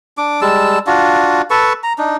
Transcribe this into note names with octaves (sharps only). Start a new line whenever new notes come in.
D4 D6
G3 G#3 A5 E6
D4 F4 F#4
A4 B4 A5 C#6
A#5
D4 D#4